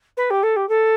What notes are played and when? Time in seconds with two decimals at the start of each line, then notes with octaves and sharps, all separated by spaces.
0.17 B4
0.30 G4
0.43 A4
0.56 G4
0.69 A4